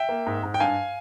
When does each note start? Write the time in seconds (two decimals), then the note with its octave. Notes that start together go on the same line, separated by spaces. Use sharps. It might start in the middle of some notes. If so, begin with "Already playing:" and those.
Already playing: E5 G5
0.09 A#3
0.26 G#2
0.43 G#2
0.54 G5
0.60 G2 F5 G#5